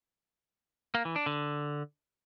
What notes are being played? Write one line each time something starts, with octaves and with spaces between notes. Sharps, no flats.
A#3
E3
D4
D3